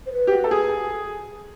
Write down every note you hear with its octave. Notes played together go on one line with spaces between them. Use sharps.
C5
B4
G4
F#4
A4
G#4